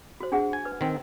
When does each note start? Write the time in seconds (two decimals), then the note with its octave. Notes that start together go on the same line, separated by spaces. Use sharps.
0.20 F#4 C5
0.32 D4 G#4 F#5
0.53 G#5
0.65 B4
0.81 D#3 C4